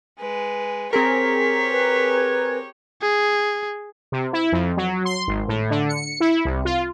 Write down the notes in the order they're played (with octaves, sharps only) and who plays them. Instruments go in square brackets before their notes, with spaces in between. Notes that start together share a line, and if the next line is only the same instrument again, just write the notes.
[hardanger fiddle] G#3 B4
[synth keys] C4 G#4 A#4 [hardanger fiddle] G4 C#5 [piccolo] B6
[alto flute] B4
[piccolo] G#6
[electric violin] G#4
[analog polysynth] C3
E4
F2
F#3
C6
G#1
A2
D3
C#7
E4
C2
F4